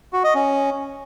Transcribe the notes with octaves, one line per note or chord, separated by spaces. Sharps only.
F#4
D#5
C#4